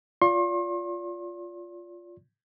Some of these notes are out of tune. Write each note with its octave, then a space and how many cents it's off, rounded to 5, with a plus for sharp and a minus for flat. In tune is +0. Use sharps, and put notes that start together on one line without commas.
F4 +0 D5 -30 C6 +40